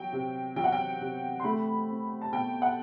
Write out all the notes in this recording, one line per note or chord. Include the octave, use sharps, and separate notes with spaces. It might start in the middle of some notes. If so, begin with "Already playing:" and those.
Already playing: F#3 G5
C3
F#3 G5
F#5
G5
C3
C6
A3 B5
C4
A5
B2 G5
F#5